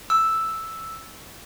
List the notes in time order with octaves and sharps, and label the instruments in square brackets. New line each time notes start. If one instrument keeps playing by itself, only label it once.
[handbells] E6